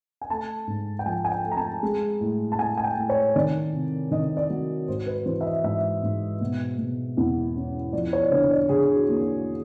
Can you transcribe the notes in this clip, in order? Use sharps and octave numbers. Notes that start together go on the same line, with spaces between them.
G#5
A3 A5
G#2
G5
F3 G#5
G#5
G5
A3
A#5
A5
G#3
A2
A5
A2 G#5
G#5
G5
A2
C#5
D#3 D5
C3
D#3 D#5
D5
F#3
G#2 C5
B4
E3 C5
E5
D#5
G#2 E5
G#2
B2
B2
E2
C#4
F3 D5
C#5
D5
D3 C#5
D5
D3 G#4
F#4
A#3
F#4